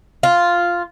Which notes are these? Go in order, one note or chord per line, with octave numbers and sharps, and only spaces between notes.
F4